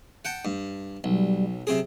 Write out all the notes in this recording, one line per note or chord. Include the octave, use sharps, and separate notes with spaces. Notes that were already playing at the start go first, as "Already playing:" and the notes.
F#5 G5 A5
G2
B1 G3
F#3
C3 C4 G#4